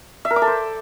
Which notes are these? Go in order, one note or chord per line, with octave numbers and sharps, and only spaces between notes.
E5
A#4
D6
A4
C5